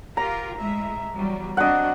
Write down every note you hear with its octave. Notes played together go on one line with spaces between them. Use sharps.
F4 G4 A#4 A#5
A2 G#3 E5
E2 F#3 G3
C4 D4 F#4 D#5 F#5